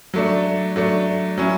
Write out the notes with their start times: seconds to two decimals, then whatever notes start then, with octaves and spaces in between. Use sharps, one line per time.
0.14 F#3 A3 D4
0.76 F#3 A3 D4
1.38 F#3 C#4 E4